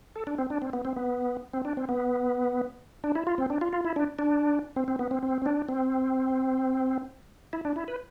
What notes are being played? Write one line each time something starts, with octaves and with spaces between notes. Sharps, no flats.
A4
D4
C4
D4
C4
B3
C4
B3
C4
D4
C4
B3
D4
E4
F4
C4
D4
F4
F4
E4
D4
D4
C4
C4
B3
C4
C4
C4
D4
C4
E4
D4
E4
B4